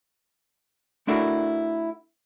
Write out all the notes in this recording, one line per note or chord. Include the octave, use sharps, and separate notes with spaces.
A3 D4 E4 F#4 A4 A#4